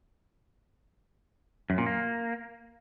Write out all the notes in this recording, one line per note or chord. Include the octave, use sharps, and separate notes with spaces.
F#2
A#2
A#3